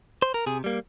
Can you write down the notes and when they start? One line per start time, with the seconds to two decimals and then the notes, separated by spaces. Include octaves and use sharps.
0.22 C5
0.34 A#4
0.46 C3 G#4
0.64 G3 A#3